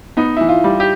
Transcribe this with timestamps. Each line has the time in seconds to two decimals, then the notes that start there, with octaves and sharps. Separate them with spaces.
0.17 B3 D#4
0.37 E3 E4
0.49 F4
0.64 G3
0.80 G4